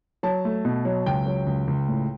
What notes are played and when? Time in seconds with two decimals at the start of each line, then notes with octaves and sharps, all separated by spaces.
0.23 F#3 A5
0.45 A3
0.65 B2
0.85 F#3
1.06 C#2 G5
1.26 F#3
1.46 C#2
1.67 C#2
1.88 A2